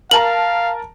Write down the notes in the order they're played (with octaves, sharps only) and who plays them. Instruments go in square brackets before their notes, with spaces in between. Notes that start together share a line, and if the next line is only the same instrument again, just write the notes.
[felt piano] A#4 A5 A#5 [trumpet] F5 [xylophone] F#7